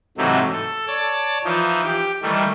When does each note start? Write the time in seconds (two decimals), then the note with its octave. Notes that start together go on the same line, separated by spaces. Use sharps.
0.18 G#2 C3 E3 F#3 A3 D#4
0.52 A4
0.87 C#5 D5 A5
1.44 E3 F3 D#4
1.84 G4
2.22 D#3 E3 G3 A3